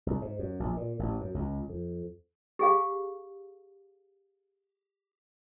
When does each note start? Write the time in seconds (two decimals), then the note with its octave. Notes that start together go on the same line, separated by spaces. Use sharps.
0.06 C2
0.21 G#2
0.39 F#2
0.60 A#1
0.77 A#2
0.99 A1
1.21 F#2
1.34 C#2
1.69 F2
2.59 G4 G#4 F5